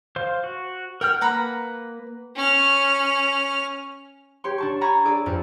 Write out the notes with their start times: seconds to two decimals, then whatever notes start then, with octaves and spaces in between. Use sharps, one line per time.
0.16 C5 F5 C6
0.44 F#4
1.01 A#4 F#5 G5 F6
1.21 A#3 B4 F#5 A#5 B5
2.36 C#4 F6
4.44 G4 C#5 C6
4.58 D4 A5 C#6
4.81 G#5 A#5 B5 C#6 G#6 A6
5.05 G#4 A4 D5
5.26 F2